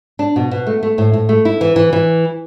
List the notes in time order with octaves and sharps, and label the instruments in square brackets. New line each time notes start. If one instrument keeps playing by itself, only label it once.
[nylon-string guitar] D4
B2
B2
A3
A3
A2
A2
A3
E4
E3
E3
E3